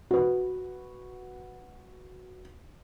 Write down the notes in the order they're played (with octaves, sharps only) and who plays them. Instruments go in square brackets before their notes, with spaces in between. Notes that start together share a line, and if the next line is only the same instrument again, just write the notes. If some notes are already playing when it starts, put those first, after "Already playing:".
[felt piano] F#4 B4